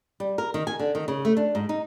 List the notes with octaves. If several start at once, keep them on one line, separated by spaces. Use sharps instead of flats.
G3
A#4
D#3
G#5
D3
D#3
C#3
A3
D4
G#2
D#4